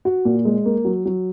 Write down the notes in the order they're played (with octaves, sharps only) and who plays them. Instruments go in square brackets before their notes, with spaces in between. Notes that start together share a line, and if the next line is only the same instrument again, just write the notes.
[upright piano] F#4
A#2
G#3
A#3
F#3
F#3